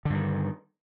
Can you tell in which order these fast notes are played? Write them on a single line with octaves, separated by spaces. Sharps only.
D3 G2 D#3